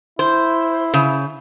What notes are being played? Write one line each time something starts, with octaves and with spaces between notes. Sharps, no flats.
E4 C5
C#3